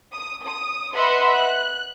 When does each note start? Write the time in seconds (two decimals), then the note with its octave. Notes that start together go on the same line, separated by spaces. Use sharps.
0.13 D#6
0.44 D#6
0.95 B4 D#5 E5 F#5 B5 C6
1.32 F#6